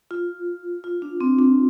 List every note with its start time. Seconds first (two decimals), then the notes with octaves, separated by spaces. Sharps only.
0.11 F4
0.84 F4
1.02 D4
1.20 C4
1.39 D4